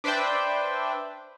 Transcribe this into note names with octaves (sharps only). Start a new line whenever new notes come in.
D4 B4 C5 D5 E5 G5